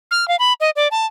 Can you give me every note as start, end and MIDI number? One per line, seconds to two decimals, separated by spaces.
0.11 0.27 89
0.28 0.36 77
0.39 0.53 83
0.60 0.70 75
0.76 0.88 74
0.91 1.06 81